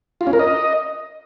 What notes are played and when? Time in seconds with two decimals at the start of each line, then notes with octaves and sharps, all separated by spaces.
0.21 F4
0.27 C#4
0.33 A#4
0.39 D#5